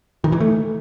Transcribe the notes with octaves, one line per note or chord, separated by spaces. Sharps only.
D#3
E3
A3